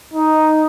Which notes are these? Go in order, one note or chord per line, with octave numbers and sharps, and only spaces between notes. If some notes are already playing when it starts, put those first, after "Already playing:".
D#4